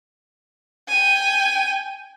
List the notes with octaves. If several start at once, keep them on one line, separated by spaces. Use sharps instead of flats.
G5 G#5